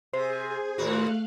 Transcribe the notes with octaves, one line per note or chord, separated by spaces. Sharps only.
C3 G#4 C5 G#5
D#2 A2 A3 F#4 F5 F#6